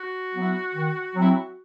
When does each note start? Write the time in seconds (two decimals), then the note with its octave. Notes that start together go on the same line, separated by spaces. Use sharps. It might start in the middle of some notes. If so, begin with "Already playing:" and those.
Already playing: F#4
0.33 F#3 B3 E4
0.73 D#3
1.13 F#3 C4 E4